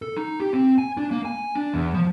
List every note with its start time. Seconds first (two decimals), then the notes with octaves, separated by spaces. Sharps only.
0.02 A4
0.17 D#4
0.40 G4
0.53 C4
0.78 G#5
0.97 D4
1.11 A#3
1.25 G#5
1.55 D4
1.74 E2
1.94 F3